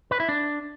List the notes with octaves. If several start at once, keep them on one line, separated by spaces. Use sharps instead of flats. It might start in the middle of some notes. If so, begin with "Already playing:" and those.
B4
E4
D4